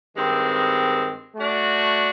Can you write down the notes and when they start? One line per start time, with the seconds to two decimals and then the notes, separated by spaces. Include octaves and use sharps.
0.16 G2 D#3 G#3 C4
1.36 A3 D4 F#4